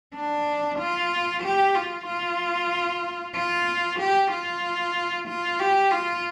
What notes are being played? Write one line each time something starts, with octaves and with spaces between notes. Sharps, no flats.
D4
F4
G4
F4
F4
F4
G4
F4
F4
G4
F4